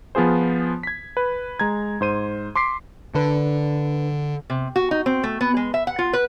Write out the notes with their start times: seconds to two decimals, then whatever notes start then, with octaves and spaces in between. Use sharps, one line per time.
0.15 F3 B3 F4 G#4 C5
0.83 G#6 B6
1.17 B4
1.60 G#3 A#5 G#6
2.01 G#2 C5 D#7
2.56 C6 D6 B6 C7
3.15 D3 D4 B4
4.50 C3
4.76 F#4
4.91 D#4
5.06 C4
5.23 A3
5.41 B3
5.57 G#3
5.74 E5
5.87 F#5
5.99 F4
6.13 B4